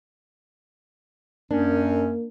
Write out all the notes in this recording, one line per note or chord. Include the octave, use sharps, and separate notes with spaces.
F#2 A#3 C#4 D4